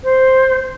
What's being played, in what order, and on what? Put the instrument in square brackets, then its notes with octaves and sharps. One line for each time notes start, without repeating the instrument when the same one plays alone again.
[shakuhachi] C5